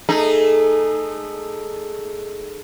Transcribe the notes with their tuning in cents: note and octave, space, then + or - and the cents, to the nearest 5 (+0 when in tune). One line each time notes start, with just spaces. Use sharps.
A3 +0 D#4 -20 G#4 +0